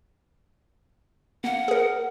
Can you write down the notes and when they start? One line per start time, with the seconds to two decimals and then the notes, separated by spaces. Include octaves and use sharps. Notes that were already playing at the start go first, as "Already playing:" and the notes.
1.44 A#3 F5 F#5
1.68 G#4 A#4